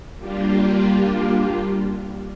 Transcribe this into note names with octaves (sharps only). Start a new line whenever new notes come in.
G3 A#3 D4 F4 G4